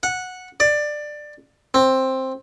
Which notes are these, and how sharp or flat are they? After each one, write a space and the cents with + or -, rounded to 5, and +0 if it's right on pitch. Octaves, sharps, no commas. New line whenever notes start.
F#5 -10
D5 +15
C4 +10